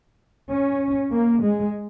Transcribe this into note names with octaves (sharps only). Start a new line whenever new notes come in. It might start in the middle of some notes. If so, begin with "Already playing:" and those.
C#4
A#3
G#3